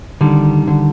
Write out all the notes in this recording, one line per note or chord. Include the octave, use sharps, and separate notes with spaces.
D3 D#3 G3
D3